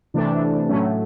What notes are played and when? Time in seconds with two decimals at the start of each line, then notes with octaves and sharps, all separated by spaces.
0.14 C3 E3 A3 D4
0.69 A2 F#3 A3 C#4